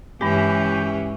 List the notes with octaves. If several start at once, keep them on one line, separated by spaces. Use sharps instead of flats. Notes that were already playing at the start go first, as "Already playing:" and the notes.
G2 E3 G#3 C#4 G4